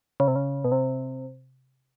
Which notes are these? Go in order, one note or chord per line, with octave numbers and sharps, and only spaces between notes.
C#3
C3
C#3
B2
C3